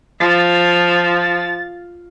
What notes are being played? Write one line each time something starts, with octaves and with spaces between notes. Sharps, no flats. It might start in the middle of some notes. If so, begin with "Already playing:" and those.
F3 A6